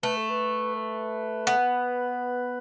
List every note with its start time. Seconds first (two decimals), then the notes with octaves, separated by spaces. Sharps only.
0.03 A3 B4
0.17 A4
0.30 B4
0.75 B4
1.47 B3